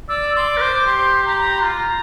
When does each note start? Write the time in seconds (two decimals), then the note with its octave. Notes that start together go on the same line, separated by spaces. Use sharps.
0.09 D5 E6
0.35 D5 C6
0.48 D6
0.57 A#4
0.61 C5
0.86 G4 C6
1.26 G4 A#5
1.33 C6
1.40 A#5
1.58 C6
1.64 F4 A#5